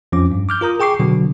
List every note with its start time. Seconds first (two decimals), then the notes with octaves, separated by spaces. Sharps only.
0.12 F2 F3 C#4 D6
0.32 G2
0.49 D6 F6 G6
0.61 F4 A#4 A#5 D#6
0.80 G#4 G5 C#6 D6 C7
1.00 B2 D3 F#3 B3